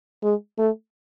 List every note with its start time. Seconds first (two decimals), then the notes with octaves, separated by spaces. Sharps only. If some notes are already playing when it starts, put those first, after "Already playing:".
0.23 G#3
0.58 A3